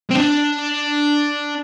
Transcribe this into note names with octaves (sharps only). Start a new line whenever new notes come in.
C4
D4